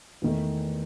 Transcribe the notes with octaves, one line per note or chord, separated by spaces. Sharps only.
E2 D#3 A3